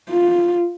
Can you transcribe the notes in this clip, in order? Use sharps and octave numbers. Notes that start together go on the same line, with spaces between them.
F4